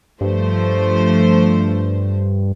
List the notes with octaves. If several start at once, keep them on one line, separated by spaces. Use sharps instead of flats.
G2 F3 A3 C5